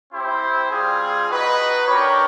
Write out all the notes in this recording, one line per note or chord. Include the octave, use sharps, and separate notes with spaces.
C4 E4 G4 C5
G3 C4 F4 G#4
D#4 F#4 B4 D#5
D4 G4 A#4 C#5